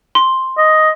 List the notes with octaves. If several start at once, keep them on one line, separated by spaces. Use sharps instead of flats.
C6
D#5